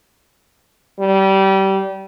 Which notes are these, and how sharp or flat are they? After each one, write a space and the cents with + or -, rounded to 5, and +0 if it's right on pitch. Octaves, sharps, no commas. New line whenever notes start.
G3 -25